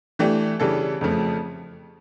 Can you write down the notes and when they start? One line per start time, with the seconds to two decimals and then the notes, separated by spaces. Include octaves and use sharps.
0.19 E3 A3 D4 G4
0.60 C#3 E3 G3 D4 A4
1.01 F2 C#3 F3 A3